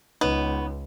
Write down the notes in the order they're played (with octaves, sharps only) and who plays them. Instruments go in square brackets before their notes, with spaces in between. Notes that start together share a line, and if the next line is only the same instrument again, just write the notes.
[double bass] C#2 [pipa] B3 [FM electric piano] D#4 C#5